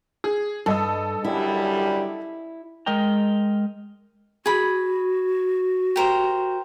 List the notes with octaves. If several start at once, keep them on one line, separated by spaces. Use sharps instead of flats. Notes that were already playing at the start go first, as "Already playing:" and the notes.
G#4
G2 A4 D#5 E6
F#2 D3 G3 E4
G#3 A#4 D#5 G5 A#5
F#4 G#4 B5
G4 A#4 C5